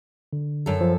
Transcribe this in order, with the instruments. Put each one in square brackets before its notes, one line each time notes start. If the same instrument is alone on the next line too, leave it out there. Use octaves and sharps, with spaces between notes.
[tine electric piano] D3
[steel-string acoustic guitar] F#2 A4
[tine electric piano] F3